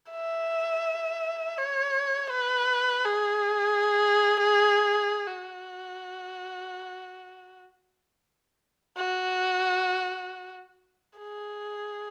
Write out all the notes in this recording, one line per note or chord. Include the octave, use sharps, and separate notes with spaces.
E5
C#5
B4
G#4
F#4
F#4
G#4